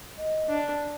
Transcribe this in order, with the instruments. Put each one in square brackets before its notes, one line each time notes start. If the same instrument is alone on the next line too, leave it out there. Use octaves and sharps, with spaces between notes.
[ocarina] D#5
[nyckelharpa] D4